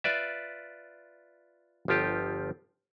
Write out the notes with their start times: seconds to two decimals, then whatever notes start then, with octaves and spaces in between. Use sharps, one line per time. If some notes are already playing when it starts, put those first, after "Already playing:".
0.04 F4 B4 D5 E5
1.88 G1 F3 F4 G4